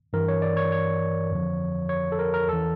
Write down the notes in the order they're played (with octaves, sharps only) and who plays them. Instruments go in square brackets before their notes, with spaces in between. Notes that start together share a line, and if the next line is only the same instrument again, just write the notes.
[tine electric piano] G2 E3 A#4
C#5
D5
C#5
C#5
F2 D3 F3
C#5
A4
A#4
A#4
E2 E3 A4